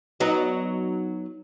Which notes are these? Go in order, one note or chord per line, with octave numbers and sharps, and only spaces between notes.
F#3 B3 D#4